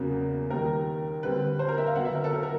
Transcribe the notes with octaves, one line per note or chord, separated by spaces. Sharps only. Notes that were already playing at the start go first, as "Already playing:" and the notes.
Already playing: E2 C#3 F#3 A#3
D#2 D#3 G3 A#4
D3 G3 C4 B4
C5
A#4
E5
F5
D3 F#3 B3 F#5
E5
A#4
A4
A#4
A#4